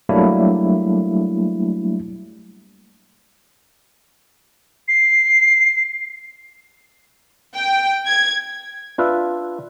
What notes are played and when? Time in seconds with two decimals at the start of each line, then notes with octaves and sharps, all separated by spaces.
0.09 F#3 G3 A3 A#3 D4 E4
4.88 C7
7.56 G5
8.07 G#6
8.98 D4 F4 B4 E5